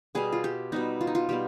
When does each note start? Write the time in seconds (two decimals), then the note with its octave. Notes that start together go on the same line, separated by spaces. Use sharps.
0.15 B2 G3 B3 G#4
0.32 F4
0.44 G4
0.72 B2 G3 B3 D#4
1.01 F4
1.07 D#4
1.15 F4
1.29 B2 G3 B3 G4